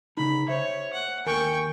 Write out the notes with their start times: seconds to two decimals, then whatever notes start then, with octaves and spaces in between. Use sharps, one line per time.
0.17 C#3 D#4 B5
0.48 C5 C#5 E5
0.93 F#5
1.26 D#2 A#4 G5 G#5 C#6